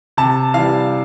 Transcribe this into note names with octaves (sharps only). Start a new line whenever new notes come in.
C3 A5
E3 G3 F5